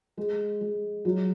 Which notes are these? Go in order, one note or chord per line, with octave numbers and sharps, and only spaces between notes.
G#3
G#3
F#3 F4